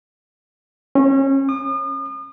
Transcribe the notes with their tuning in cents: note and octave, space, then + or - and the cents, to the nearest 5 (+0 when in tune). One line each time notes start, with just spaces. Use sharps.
C#4 -30
D#6 -40